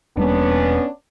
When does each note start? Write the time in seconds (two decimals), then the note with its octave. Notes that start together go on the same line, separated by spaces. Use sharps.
0.17 E1 G3 A#3 B3 C#4 D4